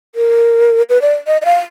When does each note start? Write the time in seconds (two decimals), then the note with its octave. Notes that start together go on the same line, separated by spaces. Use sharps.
0.15 A#4
0.90 B4
1.02 D5
1.27 D#5
1.42 D#5
1.45 F5